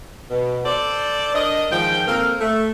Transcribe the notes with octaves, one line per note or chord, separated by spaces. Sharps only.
B2
A4 C5 D5
D4 A#4 D#5
G#2 D#3 F3 G5
A#3 C4 A4 A#4
A3